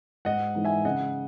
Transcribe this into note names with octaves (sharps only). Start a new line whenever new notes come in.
G#2 D#5 F#5
E3 G#3 D#4
E5 G#5
C#3 D#5 F#5